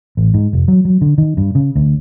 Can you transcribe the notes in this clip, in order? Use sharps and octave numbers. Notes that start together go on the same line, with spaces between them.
A1
G#2
F1
F#3
F#3
D3
D#3
G2
C#3
D2